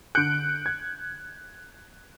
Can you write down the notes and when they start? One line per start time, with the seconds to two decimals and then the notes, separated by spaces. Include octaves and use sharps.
0.15 D3 F#6 G6 C#7 D7
0.66 G#6